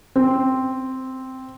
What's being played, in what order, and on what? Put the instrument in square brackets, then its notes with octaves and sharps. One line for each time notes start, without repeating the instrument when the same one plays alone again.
[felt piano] C4